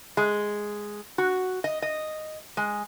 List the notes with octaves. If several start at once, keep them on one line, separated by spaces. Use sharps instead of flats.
G#3
F#4
D#5
D#5
G#3